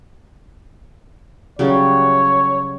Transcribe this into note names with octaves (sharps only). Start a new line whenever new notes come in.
C#3 F#3 G3 C#5